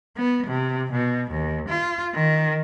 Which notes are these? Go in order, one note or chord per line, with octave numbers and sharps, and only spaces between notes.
B3
C3
B2
D#2
F4
D#3